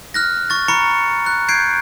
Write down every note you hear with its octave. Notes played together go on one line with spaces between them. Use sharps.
F6 F#6 A#6
C#6 A6
A#5 B5 C#6 C#7
F#6
G6 G#6 C7 D7